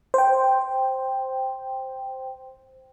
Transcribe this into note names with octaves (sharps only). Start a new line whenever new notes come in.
C5 G5